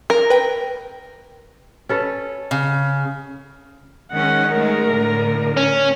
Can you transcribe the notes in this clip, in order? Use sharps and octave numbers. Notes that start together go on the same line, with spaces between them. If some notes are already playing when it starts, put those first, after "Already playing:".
A#4
B4 G5
C#4 A4 B4
C#3
D#3 G#3 C#4 F#5
G#3 A3 A#4
A2 D3
C#4